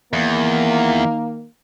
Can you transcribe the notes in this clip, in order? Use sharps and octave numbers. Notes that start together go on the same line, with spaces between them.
E2 D#3 A#3